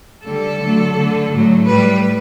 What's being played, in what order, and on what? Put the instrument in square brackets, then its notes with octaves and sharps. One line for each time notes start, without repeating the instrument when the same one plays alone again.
[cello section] D3 G3 A4
D3 F#3 A3
D3 A3
A2 F#3 A3
A2 G3 B4